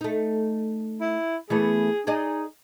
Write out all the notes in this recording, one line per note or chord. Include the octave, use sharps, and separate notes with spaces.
A3 D#4
E4
E3 A3 B3 G#4
D#4 G#4 D5 D#5